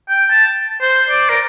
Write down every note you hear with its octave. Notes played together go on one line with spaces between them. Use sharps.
G5
A5
C5
D5
A#4